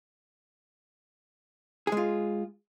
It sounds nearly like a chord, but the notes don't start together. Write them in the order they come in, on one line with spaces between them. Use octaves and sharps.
G#4 G#3 F4